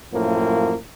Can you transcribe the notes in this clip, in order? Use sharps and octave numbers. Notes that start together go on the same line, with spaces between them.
F#2 A2 F3 A#3